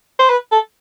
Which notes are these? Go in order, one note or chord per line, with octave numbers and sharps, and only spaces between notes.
C5
B4
A4